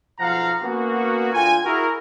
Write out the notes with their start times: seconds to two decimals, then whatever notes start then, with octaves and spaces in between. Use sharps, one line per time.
0.19 B1 F3 F5 F#5 A#5
0.63 A#3 B3 C#4 F#4
1.33 D2 F4 G5 G#5
1.64 E4 F#4 G#4 A#4